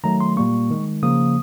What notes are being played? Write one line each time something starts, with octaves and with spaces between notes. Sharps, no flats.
D#3 F#3 A3 A#5
C6
A#2 G3 A#3 C#6
D#3 G#3
C#3 F3 A#3 D#6